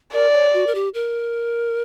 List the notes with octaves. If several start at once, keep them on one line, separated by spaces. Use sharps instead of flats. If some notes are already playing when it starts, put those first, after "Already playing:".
A#4 D5
C#5
F#4
A#4
G4
A#4